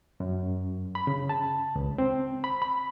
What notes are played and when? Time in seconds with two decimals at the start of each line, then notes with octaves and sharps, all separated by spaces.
0.20 F#2
0.95 B5
1.07 C#3
1.29 A5
1.76 C#2
1.98 C4
2.44 B5
2.62 B5